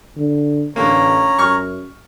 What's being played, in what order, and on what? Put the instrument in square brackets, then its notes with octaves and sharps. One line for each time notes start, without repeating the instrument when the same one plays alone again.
[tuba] D3
[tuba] A1 [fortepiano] D3 A#3 [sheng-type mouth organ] C#4 A#5
[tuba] F#2 [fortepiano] C#6 F6